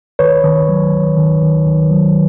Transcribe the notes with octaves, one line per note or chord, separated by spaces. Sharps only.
D#3 B4 C#5
D#3
F#3
D#3
D#3
D#3
D#3
F#3